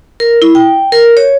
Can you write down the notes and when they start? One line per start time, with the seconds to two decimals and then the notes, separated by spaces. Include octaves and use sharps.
0.20 A#4
0.42 E4
0.55 G5
0.92 A#4
1.17 C#5